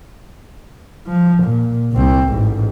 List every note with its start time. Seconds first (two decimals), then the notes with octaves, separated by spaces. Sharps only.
1.07 F3
1.43 A#2
1.93 C2 C4
2.28 A1 G#2